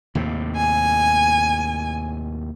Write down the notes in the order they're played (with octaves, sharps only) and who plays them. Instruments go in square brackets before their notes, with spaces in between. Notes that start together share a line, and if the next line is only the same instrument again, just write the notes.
[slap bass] D#2 A2 C3
[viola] G#5